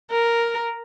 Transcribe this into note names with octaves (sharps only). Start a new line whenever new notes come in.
A#4